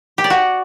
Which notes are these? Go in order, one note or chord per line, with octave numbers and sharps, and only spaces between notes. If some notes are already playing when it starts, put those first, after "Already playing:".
G4
D5
F#4